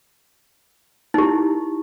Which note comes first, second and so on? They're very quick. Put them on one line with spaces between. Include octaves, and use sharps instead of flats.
D#4 G4 E4